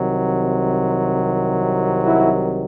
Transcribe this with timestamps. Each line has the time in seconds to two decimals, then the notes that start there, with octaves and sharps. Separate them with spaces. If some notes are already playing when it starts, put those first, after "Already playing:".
Already playing: C2 C3 D#3 F#3
2.04 E4 F#4